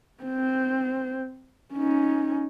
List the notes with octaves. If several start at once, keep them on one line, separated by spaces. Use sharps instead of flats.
C4 C5
C#4 D#4